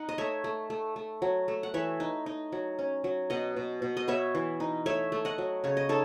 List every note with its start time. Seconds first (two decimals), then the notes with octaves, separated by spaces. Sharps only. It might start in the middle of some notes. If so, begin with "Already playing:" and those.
Already playing: D#4 F#5
0.09 D#5
0.18 A3 C#5 E5
0.44 A3
0.70 A3
0.96 A3
1.22 F#3
1.48 A3
1.63 F#5
1.74 E3 C#5 E5
2.00 D#4
2.26 D#4
2.52 F#3
2.79 C#4
3.04 F#3
3.30 B2 D#5 F#5
3.56 B2
3.82 B2
3.97 D#5
4.08 B3 C#5 E5
4.35 E3
4.60 D#4
4.86 A3 C#5 E5
5.12 A3
5.25 D#5 F#5
5.38 F#3
5.64 C#3 C#5
5.77 D#5
5.89 D#4 A4 C#5